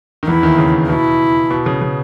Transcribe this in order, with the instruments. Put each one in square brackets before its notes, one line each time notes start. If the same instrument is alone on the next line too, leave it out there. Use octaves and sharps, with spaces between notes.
[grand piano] D#3
[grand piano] E2 E3 [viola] E4
[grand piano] D#2 D#3
C#3
[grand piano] B2 [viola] E4
[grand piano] B2
C#3
C#3